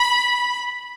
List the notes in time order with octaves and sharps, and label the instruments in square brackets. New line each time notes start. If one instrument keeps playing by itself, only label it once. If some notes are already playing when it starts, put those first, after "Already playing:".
Already playing: [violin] B5